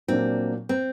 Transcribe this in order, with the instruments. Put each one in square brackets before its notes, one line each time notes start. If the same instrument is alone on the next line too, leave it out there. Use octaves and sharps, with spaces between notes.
[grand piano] A#2 F#3 A#3 D4 [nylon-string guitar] C4
[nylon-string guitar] C4